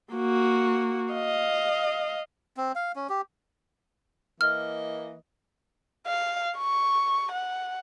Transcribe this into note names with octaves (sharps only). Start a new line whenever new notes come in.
A#3 F#4
D#5 F5
C4
F5
C#4
G4
E3 A#3 D#5 F6
F5
C#6
F#5